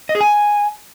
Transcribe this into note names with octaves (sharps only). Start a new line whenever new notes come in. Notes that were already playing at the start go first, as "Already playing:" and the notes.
D#5
G#4
G#5